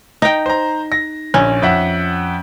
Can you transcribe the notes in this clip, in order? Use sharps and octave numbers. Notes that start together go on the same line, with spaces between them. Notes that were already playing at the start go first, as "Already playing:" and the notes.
D#4 G5 A#6
C5 A#5
A#6
A#1 C#4
F2 E5 F#5